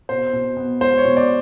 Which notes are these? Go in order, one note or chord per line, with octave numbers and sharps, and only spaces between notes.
B2 C5
B2
B3
G#3 C5
C#5
B2
D5